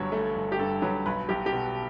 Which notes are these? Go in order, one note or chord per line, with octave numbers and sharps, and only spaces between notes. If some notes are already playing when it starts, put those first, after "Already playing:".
Already playing: G1 G2 F#3 C#5
A3
G1
G4
G2 A4
F#3 B4
B1 B4
B1 G4
G4
B2 F#4